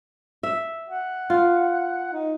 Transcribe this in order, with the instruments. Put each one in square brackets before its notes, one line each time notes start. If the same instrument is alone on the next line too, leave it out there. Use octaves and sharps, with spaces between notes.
[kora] E5
[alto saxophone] F#5
[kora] F4
[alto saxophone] D#4